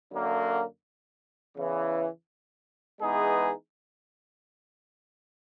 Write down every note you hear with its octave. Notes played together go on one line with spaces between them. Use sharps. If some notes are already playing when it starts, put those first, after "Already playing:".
F#2 D3 F#3 A#3
E2 C#3 E3
E3 G#3 B3 D#4 G#4